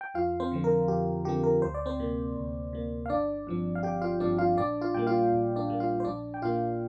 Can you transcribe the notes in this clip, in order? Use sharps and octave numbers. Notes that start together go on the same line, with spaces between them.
G5
F2 F4 F5
C4 C5
D3 F3 C4
A#4
F2 G4
D3 F3 C4 G4
A#4
D2 C5
D5
C4 C5
C3 A#3
D2
C3 A#3
F5
G1 D4 D5
G2 F3 C4
F5
G1 G4 G5
F4 F5
G2 F3 C4 D4 D5
F4 F5
A#1 D4 D5
F4 F5
A#2 G3 A#3 G5
F4 F5
A#1
D4 D5
A#2 G3 A#3
F4 F5
C5
A#1 D4 D5
G5
A#2 A#3 F4 F5